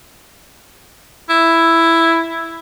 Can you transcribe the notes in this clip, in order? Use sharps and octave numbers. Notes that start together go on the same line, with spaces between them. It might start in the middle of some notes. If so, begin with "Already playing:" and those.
E4